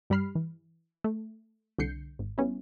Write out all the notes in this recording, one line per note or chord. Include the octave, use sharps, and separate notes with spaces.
G2 G3 G4 B5 F6 C7
E3
A3
C2 D3 G6 C7 C#7
G#1
G3 B3 C#4 E4